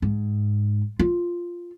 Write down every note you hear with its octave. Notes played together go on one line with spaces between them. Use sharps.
G#2
F4